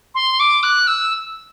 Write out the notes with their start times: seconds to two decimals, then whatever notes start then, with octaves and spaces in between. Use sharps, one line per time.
0.14 C6
0.39 D6
0.63 F#6
0.87 E6